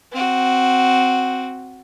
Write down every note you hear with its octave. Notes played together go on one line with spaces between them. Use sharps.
C4 F#4